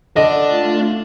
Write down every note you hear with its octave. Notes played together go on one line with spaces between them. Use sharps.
D3 D4 D5 D#5
A3 F4